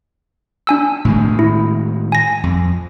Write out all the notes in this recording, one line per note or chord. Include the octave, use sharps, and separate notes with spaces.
D4 G#5 E6
A2 D#3 G#3
E4
G#5 A#6
F2